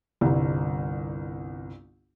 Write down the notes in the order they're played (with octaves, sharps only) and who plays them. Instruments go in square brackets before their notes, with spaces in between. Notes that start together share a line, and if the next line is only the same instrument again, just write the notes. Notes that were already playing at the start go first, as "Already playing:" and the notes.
[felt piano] G1 C2